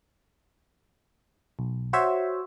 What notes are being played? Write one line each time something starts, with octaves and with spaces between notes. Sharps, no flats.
B1
F#4 C5 C#5 E5